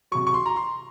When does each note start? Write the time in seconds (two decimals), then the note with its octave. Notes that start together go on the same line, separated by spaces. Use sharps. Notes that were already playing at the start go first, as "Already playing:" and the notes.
0.11 C3 F#3 C#6
0.27 C#6
0.34 C6
0.46 A#5
0.56 C6